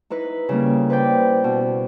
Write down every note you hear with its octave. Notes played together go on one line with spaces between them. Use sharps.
D#4 E4 B4
C#3 G3 A#3
B4 C5 D5 G5
B2